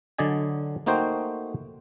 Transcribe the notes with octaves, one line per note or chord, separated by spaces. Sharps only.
D3 F#3 D5 D#5 G#5
A3 A#3 D#4 F#4 C5 G5